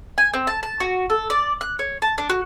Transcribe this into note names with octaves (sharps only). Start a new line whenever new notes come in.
G#5
C4
A5
A5
F#4
A4
D5
F#6
C#5
A5
D4
F#4